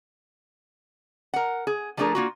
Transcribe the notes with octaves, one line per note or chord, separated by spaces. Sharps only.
A#4 F#5
G#4
F3 G3 A3 D4 G#4 A#4
A#3 F4 F#4